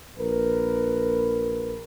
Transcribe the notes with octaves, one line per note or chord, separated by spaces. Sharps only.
A#1 A#4 B4